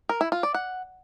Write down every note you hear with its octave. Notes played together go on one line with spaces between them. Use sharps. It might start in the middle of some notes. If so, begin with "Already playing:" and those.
A#4
E4
F4
D5
F#5